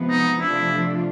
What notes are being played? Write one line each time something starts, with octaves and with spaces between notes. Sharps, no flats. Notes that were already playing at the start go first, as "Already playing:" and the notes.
Already playing: C3 F3 G#3 B3
D#4
C3 F3 A3 D4 E4 F4